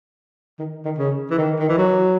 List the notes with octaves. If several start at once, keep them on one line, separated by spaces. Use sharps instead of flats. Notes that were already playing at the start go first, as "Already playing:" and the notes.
D#3
D#3
C#3
E3
D#3
D#3
E3
F#3